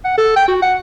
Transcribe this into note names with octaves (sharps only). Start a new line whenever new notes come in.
F#5
A4
G5
F#4
F#5